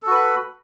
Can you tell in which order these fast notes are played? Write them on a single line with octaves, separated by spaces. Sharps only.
A4 F#4 B4 B5